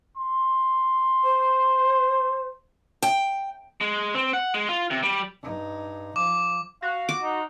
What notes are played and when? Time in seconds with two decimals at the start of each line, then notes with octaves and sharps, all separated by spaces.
0.17 C6
1.24 C5
3.02 G5
3.81 G#3
4.14 C4
4.33 F#5
4.54 G#3
4.69 F4
4.90 C3
5.03 G3
5.42 G2 D#4
6.16 F3 D6
6.82 F#4 F5
7.09 D6
7.23 D#4